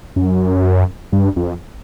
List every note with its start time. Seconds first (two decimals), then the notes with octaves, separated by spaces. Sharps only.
0.16 F#2
1.12 G2
1.36 F2